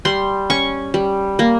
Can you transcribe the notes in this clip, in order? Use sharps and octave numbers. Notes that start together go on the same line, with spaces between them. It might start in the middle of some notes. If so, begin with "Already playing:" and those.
G3 C6
C#4 C#6
G3
A#3